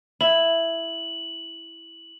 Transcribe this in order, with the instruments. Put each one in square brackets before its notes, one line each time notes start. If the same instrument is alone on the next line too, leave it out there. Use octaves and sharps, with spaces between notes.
[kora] E4 [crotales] F#7